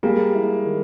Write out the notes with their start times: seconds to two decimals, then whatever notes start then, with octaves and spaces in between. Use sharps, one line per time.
0.03 G3 G#3 A#3
0.35 E4
0.65 D#3